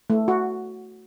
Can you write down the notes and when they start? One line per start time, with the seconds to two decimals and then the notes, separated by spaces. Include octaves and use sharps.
0.10 A3
0.28 F#4